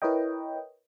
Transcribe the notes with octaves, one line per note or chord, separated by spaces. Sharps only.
E4 A#4 B4 C#5 D#5 G5